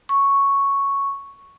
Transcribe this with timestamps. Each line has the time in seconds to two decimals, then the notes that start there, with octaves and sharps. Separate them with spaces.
0.09 C#6